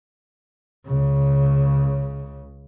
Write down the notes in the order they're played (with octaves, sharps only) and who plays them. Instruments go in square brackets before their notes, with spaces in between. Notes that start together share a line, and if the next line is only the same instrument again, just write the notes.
[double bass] C#2 C#3